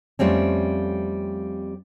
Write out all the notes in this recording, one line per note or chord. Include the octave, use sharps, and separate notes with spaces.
F2 G3 A3 C4 C#4